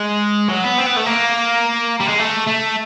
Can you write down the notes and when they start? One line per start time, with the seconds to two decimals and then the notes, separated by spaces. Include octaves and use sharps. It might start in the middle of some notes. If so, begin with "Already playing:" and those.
Already playing: G#3
0.49 F#3
0.64 B3
0.78 C4
0.86 B3
0.97 A3
1.06 A#3
2.01 G3
2.09 G#3
2.19 A3
2.48 A3